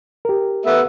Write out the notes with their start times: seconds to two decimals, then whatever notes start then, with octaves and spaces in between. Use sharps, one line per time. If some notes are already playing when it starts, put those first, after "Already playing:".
0.25 G4 A#4
0.66 A3 B3 E5